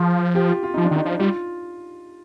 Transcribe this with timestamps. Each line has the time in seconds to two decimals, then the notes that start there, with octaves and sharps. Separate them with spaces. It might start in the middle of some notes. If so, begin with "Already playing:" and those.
Already playing: F3 G#4
0.35 G4
0.49 F4
0.63 F4
0.74 F3 D#4
0.85 D4
0.91 D#3 D#4
1.05 F3
1.19 G3 F4